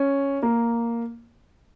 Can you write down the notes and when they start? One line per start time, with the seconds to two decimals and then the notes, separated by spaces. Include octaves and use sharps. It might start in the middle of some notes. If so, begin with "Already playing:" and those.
Already playing: C#4
0.42 A#3